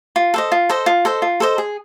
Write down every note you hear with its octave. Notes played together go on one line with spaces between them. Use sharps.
F4
A4 C5 D#5
F4
A4 C5 D#5
F4
A4 C5 D#5
F4
A4 C5 D#5
G#4